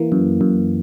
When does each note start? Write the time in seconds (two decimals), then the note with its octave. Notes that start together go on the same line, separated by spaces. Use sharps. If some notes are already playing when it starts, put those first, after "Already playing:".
Already playing: E3 A#3
0.12 F#2
0.41 F#2